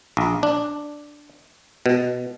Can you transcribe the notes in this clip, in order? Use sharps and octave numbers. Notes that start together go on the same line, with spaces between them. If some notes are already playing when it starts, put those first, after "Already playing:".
A#1
D4
B2